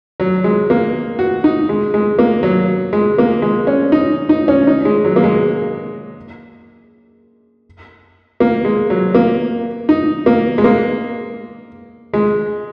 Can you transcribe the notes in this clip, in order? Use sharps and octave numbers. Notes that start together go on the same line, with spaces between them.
F#3
G#3
A#3
F#4
D#4
G#3
G#3
A#3
F#3
G#3
A#3
G#3
C#4
D#4
D#4
C#4
D#4
G#3
F#3
A#3
G#3
A#3
G#3
F#3
A#3
D#4
A#3
G#3
A#3
G#3